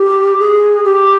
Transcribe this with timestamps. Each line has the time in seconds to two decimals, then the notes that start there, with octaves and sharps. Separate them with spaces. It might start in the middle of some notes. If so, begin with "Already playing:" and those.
Already playing: G4
0.38 G#4
0.84 G4